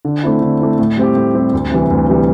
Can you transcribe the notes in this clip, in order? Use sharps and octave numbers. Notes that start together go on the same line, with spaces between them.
D3
A3 C4 E4
D3
A3 C4 E4
A2
G3 C4 G4
A2
G3 C4 G4
D2
C3 E3 G3
D2
C3 E3 G3